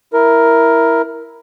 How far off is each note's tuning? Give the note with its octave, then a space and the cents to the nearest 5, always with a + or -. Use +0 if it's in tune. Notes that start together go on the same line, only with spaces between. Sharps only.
E4 +0 A#4 +5